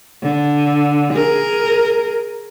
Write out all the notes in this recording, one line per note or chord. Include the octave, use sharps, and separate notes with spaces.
D3
G#4 A#4